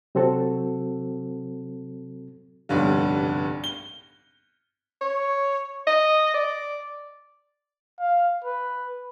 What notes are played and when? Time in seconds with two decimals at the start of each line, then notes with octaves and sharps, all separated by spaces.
0.15 C3 F#3 C4 F#4 A4
2.69 F1 B1 G2 D3
3.64 G7
5.01 C#5
5.87 D#5
6.34 D5
8.00 F5
8.44 B4